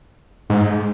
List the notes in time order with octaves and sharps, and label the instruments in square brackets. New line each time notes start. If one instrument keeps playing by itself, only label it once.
[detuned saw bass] G#2